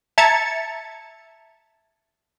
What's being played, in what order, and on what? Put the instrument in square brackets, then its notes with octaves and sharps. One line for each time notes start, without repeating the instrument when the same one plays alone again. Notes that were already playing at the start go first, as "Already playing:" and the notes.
[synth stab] E5 A5 A#5 G#6 A6 C#7